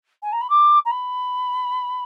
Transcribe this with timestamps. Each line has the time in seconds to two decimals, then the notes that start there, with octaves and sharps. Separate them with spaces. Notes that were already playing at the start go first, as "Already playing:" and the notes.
0.23 G#5
0.33 A#5
0.41 B5
0.50 D6
0.85 A#5
0.91 B5